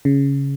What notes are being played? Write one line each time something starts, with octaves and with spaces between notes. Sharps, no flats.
C#3